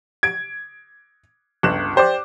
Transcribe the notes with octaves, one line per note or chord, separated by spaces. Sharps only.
G#6 D7
G1 C#2 F#6 E7
G4 C5 D5 D6